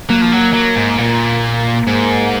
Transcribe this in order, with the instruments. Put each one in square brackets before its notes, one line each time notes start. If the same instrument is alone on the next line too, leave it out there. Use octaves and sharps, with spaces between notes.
[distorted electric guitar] F#3 [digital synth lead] A#3
[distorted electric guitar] F3
F#3
F#3
G#2
A#2
G#2